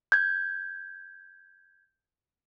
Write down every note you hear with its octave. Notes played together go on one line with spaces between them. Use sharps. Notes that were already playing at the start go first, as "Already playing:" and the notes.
G6 G#6